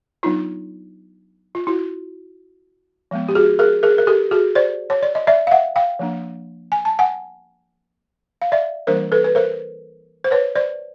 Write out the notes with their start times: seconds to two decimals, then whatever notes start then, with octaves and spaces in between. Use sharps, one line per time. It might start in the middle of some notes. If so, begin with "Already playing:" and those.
0.23 F#3 B3 D4 D#4 F4
1.55 F4
1.67 E4 F#4
3.11 F3 G#3 B3
3.29 G4
3.35 F#4 G#4
3.59 G#4 A#4
3.83 G#4 A#4
3.98 A#4
4.07 G4 A4
4.31 F#4 G#4
4.55 C5 D5
4.90 C#5
5.03 D5
5.15 D#5
5.27 D5 E5
5.47 F5
5.51 E5 F#5
5.76 F5 G5
5.99 F3 A#3 D4
6.72 G#5
6.85 A5
6.99 F#5 G#5
8.42 F5
8.52 D5 E5
8.87 E3 G3 A#3 D4 A#4 C5
9.12 A4 B4
9.24 B4
9.35 A#4 C5
10.24 C5
10.31 B4 C#5
10.56 C5 D5